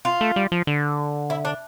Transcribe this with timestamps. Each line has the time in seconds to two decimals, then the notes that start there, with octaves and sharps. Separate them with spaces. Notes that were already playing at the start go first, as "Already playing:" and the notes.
0.05 F4
0.21 A3
0.36 G3
0.52 F3
0.67 D3
1.30 E4
1.45 D4